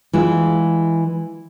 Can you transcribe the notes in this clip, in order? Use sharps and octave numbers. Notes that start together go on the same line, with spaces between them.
E3 G#3 F4